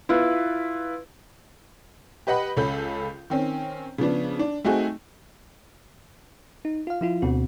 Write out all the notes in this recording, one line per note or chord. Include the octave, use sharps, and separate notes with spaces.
E4 F4 B4
G4 B4 D#5 F#5 B5
C#2 C#4 A4 B5 G6
D#3 C4 C#4
C#3 F3 B3 D4
D4
A3 C4 D#4 F#4 G#4
D#4
F4 F5
F3 E4 F4
D2 B2 D3 C4 F#4